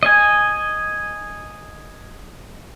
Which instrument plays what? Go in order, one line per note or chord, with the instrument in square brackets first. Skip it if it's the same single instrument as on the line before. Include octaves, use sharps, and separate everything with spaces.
[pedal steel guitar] D#5 G#5